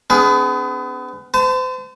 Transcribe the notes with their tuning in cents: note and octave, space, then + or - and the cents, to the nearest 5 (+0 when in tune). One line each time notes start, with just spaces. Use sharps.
B3 +35 D4 -35 G#4 +0
C5 -40 A5 +10